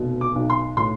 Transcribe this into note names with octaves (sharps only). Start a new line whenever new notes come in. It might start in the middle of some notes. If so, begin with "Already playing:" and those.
Already playing: F1 B2
D6
B1
C6
A2 C6